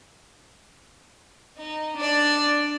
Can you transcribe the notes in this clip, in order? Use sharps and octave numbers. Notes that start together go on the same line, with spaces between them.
D#4
D4 D5